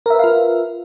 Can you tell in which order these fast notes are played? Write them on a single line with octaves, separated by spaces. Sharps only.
A#4 E5 B4 F5 F4